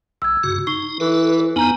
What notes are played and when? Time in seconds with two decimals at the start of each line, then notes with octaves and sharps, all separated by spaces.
0.22 C2 E6 G#6
0.43 G2 C#3 F#4
0.67 D#4 C#6 C7 G7
1.00 E3 A4 B4
1.56 F2 B3 D#4 G#5 A#5 G6